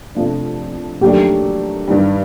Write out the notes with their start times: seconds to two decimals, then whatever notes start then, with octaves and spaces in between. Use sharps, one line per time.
0.15 F2 C3 F3 A3 D4
1.01 F#2 D#3 F#3 A3 D4 G4
1.88 G2 D#3 G3